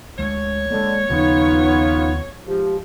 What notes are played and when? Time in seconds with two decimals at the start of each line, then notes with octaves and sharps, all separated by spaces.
0.19 D2 G#3 C#5
0.71 D3 G#3 A#3
1.10 D#2 C#3 F3 B3 D#4 F4
2.47 G#2 F3 G4